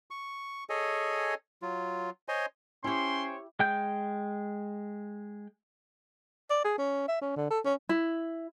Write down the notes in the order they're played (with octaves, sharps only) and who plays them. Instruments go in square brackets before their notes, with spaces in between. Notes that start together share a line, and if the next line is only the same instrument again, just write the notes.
[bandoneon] C#6
G#4 A4 C#5 D#5 G#5
F#3 F4
C5 C#5 D#5 G#5 C6
[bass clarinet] C#4 [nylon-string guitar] E4 G4 [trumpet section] C5 C#5 G5 [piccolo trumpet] C6
[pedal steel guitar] G#3 G5 G6
[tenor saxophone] D5
G#4
C#4
E5
C#4
D3
A4
C#4
[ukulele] E4